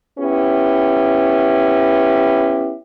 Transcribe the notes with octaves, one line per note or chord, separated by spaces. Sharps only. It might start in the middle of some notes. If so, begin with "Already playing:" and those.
B3 C#4 E4 G4